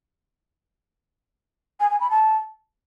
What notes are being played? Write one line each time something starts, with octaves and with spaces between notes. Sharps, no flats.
G#5
G#5
B5
A5